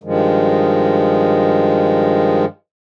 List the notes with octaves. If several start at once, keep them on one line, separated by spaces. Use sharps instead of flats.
G2 D#3 F3 G#3